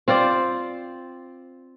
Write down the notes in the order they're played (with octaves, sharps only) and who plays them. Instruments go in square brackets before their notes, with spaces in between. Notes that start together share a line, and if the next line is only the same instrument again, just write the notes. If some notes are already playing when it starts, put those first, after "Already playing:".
[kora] C4 F4 C5 D5